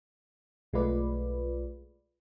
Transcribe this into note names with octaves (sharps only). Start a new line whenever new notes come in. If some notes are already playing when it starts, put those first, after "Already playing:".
B1 G#3 A3 F4 B4 D5